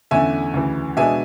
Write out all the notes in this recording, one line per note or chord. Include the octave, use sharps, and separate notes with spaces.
E2 D3 A3 C#4 E4 E5 G#5
D2 C#3 E3
B2 G#3 B3 D4 E5 G#5